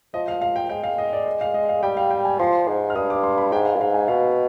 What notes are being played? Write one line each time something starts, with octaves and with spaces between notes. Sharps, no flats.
F3 D#5
F5
F5
G5
G#3 G5
F5
D#5
D5
D#5
F5
D#5
F5
G3 G5
F5
G5
G#5
F3 C6
G#2
F6
G2 D#6
D6
C6
B5
G#2 G5
F5
G2
G#2 F5
G#5
B2 F5